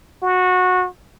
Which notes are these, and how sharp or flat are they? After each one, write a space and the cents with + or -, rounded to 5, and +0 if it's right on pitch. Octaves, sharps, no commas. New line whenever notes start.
F#4 -20